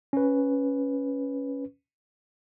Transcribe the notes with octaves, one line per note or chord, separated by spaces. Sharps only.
C#4 B4